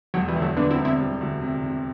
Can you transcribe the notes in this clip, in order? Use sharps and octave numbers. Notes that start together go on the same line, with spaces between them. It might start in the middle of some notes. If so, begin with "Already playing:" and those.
E1 D3 F#3
E3 G3
D2
F#3 A3
D3 B3 D4
C4 E4
E1
C4 E4
G3
D2
C3
C3